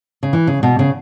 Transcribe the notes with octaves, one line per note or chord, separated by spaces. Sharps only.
C#3
E3
C#3
B2
C#3